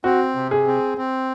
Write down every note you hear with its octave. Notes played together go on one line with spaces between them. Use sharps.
C4 F#4
C3
G#4
C4
C4